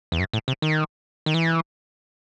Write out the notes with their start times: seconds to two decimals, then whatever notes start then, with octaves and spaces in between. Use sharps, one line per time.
0.12 E2
0.19 F#2
0.33 A2
0.48 C3
0.62 D#3
1.26 D#3
1.34 E3